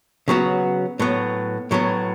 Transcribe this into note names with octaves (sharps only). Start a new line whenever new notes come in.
C#3 F#3 B3 F#4
A2 F#3 B3
A2 F#3 B3